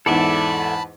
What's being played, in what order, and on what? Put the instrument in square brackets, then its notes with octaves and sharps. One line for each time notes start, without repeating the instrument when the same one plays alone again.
[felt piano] E2 G#2 [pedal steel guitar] A4 D5 E5 [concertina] A5 B5